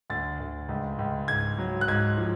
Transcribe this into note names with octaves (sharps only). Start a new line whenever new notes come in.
D2 A6
D2
C#2
C#2
G#2 G#6
F#3
F#6
G#2 G#6
F3